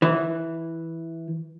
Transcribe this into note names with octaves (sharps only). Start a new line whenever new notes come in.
E3